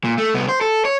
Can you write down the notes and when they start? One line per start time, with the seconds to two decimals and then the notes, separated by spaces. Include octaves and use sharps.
0.04 A#2
0.18 A3
0.34 C2 B3
0.49 C5
0.61 A4
0.85 C#5